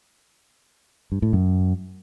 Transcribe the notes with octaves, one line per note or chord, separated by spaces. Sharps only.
G2
A2
F#2